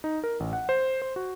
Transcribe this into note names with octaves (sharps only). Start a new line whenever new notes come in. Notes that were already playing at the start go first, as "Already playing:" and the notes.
D#4
A#4
A1
F#5
C5
C5
F#4